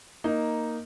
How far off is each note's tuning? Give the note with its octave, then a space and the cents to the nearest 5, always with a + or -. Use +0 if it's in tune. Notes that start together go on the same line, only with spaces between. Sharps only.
A#3 +0 D#4 +0